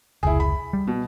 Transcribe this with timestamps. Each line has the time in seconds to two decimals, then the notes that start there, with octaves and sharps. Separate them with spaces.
0.23 F1 C#2 E4 G#4
0.40 B5
0.73 G3
0.87 B2